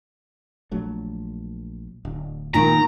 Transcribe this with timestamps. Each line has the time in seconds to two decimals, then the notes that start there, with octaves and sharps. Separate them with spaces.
0.71 A#1 F#3 A3
2.05 D1
2.54 A#2 D#3 A#5